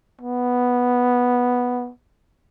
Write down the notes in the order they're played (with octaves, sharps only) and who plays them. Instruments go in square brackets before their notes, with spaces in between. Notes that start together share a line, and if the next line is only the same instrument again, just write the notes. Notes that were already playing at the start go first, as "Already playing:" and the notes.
[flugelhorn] B3